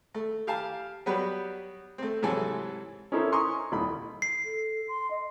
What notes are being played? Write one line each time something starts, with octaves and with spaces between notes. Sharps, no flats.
A3
G4 F5 G#5 A5
F#3 G3 B3 F#4 G4 B4
A3 C4
G#2 C3 E3 F#3 A4 G#5
C#4 D#4 E4 A4 A#4 C5
G#5 A#5 C6 C#6 D#6
D#1 C2 D#4 B5
C7
A4
C6
D#5